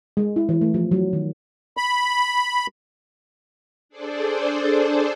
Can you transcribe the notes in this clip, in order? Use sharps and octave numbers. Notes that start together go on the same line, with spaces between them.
G#3
E4
E3
A3
F3
F#3
D#3
B5
D4 G#4 A4 C5 D5